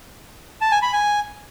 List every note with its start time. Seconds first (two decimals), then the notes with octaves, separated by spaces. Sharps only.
0.61 A5
0.72 G#5
0.82 B5
0.93 G#5